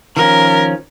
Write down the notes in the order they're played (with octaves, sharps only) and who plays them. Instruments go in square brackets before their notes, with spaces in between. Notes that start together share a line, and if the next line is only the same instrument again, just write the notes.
[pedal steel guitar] D#3 F3 C#4 [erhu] A#4